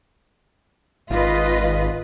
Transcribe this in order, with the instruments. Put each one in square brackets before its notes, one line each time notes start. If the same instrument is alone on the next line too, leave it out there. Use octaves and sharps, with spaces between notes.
[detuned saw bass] G#1 [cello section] F4 B4 D#5